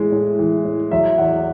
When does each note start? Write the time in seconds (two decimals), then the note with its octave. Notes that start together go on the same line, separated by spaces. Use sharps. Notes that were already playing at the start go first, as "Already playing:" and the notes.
Already playing: A2 E3 G#3
0.12 A2
0.39 E3
0.65 A2
0.91 F#3 E5
1.18 E2 F#5